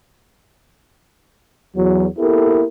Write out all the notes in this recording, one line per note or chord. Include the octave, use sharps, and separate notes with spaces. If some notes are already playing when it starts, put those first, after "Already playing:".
E2 F#3
A#3 B3 E4 G4 A4 A#4